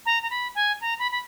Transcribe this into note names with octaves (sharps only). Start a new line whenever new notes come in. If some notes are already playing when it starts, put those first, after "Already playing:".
A#5
A#5
B5
G#5
A#5
B5
B5